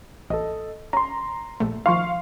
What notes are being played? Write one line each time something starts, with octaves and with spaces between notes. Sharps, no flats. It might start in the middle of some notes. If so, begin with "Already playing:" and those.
A1 A4 D#5
C#4 A#5 C6
A#1 A3
D#3 F3 F5 C6 C#6